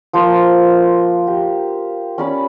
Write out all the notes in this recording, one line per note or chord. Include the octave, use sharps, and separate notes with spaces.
F3 A#3 C5
G4
C#4 D5 B5